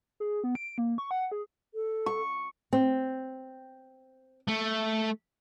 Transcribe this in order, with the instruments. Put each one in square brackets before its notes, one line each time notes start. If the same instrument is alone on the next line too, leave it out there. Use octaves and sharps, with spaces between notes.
[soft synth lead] G#4
B3
D7
A#3
C#6
F#5
G#4
[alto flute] A4
[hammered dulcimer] C#6
[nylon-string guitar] C4
[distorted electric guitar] A3